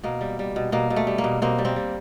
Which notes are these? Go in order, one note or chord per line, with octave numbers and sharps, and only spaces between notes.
B2 A#3
G3
G3
B2
B2 A#3
B2
A3
G3
A#3
B2
B2 A#3 C4
G3
A#3 C4
G3